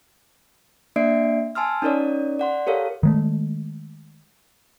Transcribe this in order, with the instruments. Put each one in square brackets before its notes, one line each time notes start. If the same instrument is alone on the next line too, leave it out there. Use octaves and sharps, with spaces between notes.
[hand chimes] A#3 D4 D5 E5 C7 D7
G#5 A5 C6 E6 F6
C#4 D#4 A#4 C#5 D5
D5 F#5 C6
G4 A4 A#4 C#5 F5
[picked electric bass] D#3 G#3 A3